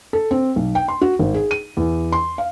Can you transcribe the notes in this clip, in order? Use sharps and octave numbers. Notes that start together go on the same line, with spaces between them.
A4
C4
B1
G5
C6
F#4
G#1
G#4
D#7
E2
C6
F5